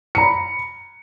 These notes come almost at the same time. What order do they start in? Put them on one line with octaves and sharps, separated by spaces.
C#7 A#5 B5